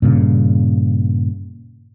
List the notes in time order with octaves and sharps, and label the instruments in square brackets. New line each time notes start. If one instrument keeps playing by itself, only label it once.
[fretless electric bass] G2 A#2 C#3